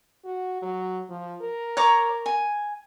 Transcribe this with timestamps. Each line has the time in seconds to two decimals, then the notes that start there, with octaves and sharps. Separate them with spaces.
0.25 F#4
0.62 F#3
1.10 F3
1.42 A#4
1.77 C#5 A#5 D6
2.26 G#5